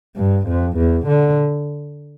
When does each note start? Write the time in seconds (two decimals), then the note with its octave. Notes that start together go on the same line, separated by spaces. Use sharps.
0.16 G2
0.48 F2
0.77 E2
1.07 D3